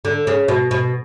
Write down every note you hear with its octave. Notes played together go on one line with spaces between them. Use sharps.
D3
C#3
B2
B2